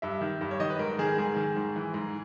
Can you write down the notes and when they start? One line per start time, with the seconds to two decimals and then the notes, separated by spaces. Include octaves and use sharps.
0.02 G2 E5
0.21 D#3
0.41 G2
0.51 C#5
0.60 D#3 D#5
0.70 B4
0.79 G#2 A#4
0.99 D#3 G#4
1.18 G#2 G#4
1.36 D#3
1.56 G#2
1.76 E3
1.94 G#2